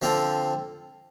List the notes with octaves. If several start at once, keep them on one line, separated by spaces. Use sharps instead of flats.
D3 F3 C4 F4 A4